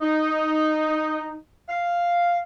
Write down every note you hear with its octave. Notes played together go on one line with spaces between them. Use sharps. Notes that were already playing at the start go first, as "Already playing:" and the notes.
D#4
F5